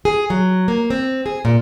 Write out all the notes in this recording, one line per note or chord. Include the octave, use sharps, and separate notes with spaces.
G#4
F#3
A#3
C4
G#4
A#2